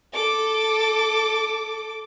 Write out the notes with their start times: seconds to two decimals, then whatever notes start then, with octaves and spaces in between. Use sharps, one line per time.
0.13 A4 D6